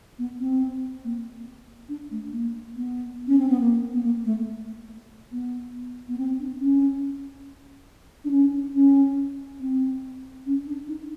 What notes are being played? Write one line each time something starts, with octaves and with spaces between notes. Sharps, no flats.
B3
C4
A#3
D4
A3
A#3
B3
C#4
C4
B3
A#3
B3
A#3
A3
B3
B3
C4
D4
C#4
D4
C#4
C#4
C4
C#4
D4
D#4